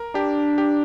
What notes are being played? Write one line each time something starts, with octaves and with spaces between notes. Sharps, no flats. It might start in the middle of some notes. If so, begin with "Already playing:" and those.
Already playing: A#4
D4 G4
G4